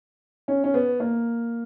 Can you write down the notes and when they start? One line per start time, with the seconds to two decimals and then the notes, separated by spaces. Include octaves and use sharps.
0.48 C#4
0.64 C#4
0.74 B3
1.00 A#3